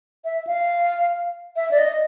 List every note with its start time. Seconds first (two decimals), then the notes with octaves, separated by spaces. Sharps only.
0.25 E5
0.47 F5
1.56 E5
1.71 D5
1.78 D#5